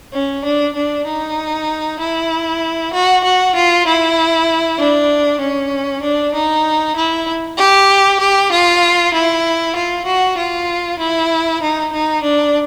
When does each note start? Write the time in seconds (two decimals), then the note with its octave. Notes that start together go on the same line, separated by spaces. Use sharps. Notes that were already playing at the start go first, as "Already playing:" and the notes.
0.14 C#4
0.45 D4
0.76 D4
1.07 D#4
2.00 E4
2.93 F#4
3.24 F#4
3.55 F4
3.87 E4
4.79 D4
5.40 C#4
6.03 D4
6.34 D#4
6.96 E4
7.58 G4
8.20 G4
8.52 F4
9.14 E4
9.76 F4
10.06 F#4
10.38 F4
10.99 E4
11.62 D#4
11.93 D#4
12.23 D4